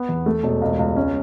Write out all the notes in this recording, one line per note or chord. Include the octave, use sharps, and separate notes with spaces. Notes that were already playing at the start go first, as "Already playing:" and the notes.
Already playing: B3
E2
A3
E1
C#2
C#2
C#4